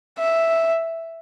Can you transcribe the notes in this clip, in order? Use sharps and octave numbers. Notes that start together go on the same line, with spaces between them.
E5